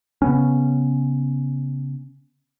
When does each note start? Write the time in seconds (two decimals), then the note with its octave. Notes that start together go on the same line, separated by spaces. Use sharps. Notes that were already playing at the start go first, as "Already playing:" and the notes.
0.22 C#3 B3 C#4